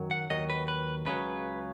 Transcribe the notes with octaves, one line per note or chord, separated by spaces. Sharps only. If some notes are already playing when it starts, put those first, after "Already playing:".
Already playing: F#2 D#3 F#3
F#5
D#2 D#3 F#3 D#5
B4
B4
C#2 C#3 F#3 B4